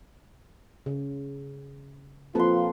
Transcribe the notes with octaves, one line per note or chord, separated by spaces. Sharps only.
C#3
F3 A#3 C4 F4 A4 B4 C6